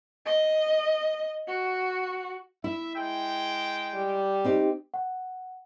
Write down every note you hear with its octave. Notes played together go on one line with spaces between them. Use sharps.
D#5
F#4
E4 E5
G#3 G5
G3
C4 D#4 G4
F#5